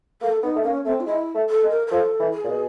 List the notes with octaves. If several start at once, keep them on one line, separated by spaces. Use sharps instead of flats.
A#3 A4
B3 D#4
A3
A#3 C#4
A3 C4
F4
G#3 E4
A3
A4
G#3
A#4
A#4
F3 A4
E3
G#4
A#2
B2